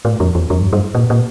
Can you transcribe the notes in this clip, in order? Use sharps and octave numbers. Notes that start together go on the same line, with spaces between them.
A2
F2
E2
F2
G2
G2
A#2
A#2